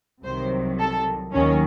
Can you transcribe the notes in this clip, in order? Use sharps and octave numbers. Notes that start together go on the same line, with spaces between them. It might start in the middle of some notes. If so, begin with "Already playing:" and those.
C2 C3 D#3 F#3 C5
A4
D#2 D#3 F#3 C#4